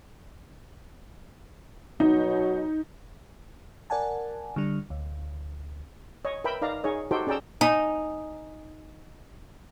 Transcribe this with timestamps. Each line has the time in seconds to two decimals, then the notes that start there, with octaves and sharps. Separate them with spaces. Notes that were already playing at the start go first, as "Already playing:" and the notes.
2.00 B2 F#3 D#4
3.90 A#4 D5 F#5 G#5 A5
4.56 D3 G3 D4
4.90 D2
6.25 C#5 D#5
6.44 A#4 B4 E5 G5 B5
6.62 D#4 A#4 D5 F5 A#5
6.84 D#4 G#4 C#5 D#5
7.11 D#4 F#4 G4 A4 C5 G5
7.27 C#4 G#4 D5 G5 A#5 E6
7.61 D#4 G#5